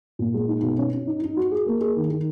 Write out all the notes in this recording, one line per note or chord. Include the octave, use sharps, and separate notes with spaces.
A#2
G#3
D#4
B2
C#4
C#4
D#4
D#4
F#4
G#4
A#3
G#4
D#3
D#3